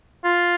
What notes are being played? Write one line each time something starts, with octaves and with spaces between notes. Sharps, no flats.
F4